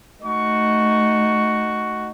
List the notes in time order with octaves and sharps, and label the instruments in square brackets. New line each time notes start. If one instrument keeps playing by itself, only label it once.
[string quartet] A3 D#4 [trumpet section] F#4 C#6